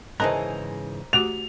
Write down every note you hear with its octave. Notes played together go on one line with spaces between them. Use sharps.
G#2 C#3 E3 A#4 C5 D#5 A5 A#5
A3 F#4 G4 F7